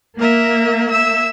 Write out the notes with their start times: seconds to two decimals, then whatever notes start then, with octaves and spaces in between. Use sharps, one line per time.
0.20 A#3 A#4 E5
0.91 E5 E6